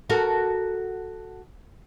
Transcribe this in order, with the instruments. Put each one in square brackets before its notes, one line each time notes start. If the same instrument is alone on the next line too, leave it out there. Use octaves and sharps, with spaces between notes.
[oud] F#4 A4 A#4